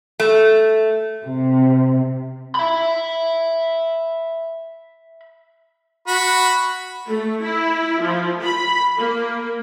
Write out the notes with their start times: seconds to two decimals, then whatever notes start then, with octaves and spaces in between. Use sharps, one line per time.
0.20 A3
1.26 C3
2.55 E5 B5
6.08 F#4 B5
7.08 A3
7.43 E4
8.02 F3
8.43 B5
8.98 A#3